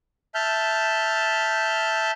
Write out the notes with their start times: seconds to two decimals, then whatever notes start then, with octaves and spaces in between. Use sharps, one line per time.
0.35 E5 A5 F6 G6